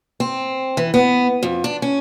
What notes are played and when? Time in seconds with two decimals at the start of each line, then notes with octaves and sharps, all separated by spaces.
0.20 C4
0.77 E3
0.94 B3
1.43 F2
1.64 D4
1.82 C#4